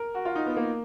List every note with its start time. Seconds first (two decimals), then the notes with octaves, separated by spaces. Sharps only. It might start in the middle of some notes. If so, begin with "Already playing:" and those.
Already playing: A#4
0.15 F#4
0.25 F4
0.35 D#4
0.46 B3
0.57 A#3